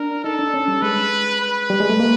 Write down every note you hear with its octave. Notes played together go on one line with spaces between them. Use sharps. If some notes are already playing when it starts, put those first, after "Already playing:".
Already playing: D4 A#4
D#4 A4
D4
C#4
G3
G#3 B4
B4
G3
G#3
A3
A#3